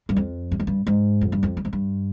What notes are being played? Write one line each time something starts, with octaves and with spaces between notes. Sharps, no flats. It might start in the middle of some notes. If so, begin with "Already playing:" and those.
G2
F2
G2
G#2
G2
G#2
F2
G2
F2
G2
G#2
G2